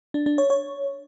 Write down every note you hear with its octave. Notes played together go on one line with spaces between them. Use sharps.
D4
D4
C#5
C#5